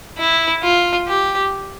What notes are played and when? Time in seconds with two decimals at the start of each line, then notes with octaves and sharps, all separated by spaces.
0.18 E4
0.63 F4
1.07 G4